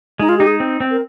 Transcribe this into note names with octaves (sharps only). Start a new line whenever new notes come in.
G#3 D#4
F4
D#4 G4
G#4
C4
C4
A#4